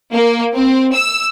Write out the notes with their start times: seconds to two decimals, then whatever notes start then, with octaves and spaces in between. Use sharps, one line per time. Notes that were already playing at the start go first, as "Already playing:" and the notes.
0.13 A#3
0.54 C4
0.94 E6